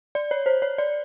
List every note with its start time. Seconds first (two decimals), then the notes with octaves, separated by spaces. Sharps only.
0.15 D5
0.31 C#5
0.46 C5
0.62 C#5
0.78 D5